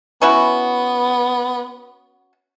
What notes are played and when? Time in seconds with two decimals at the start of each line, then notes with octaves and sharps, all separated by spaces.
0.22 B3 C#4 E4 F#4